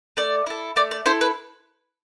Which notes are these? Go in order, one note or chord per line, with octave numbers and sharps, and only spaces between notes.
A3 D5
E4 A4
A3 D5
D5
E4 A4 C5
B4